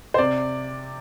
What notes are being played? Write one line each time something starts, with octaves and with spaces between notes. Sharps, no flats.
C5
C3 D5